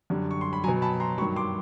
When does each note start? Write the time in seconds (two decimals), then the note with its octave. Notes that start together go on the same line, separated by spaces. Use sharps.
0.10 F#2 D3 G3
0.31 C#6
0.41 C6
0.53 B5
0.64 F#3 G#5 A#5
0.68 B2
0.82 A5 B5
1.00 A#5 C6
1.18 G2 D#3 F#3 B5 C#6
1.36 C6 D6